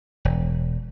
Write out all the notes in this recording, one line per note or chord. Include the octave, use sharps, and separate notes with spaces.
E1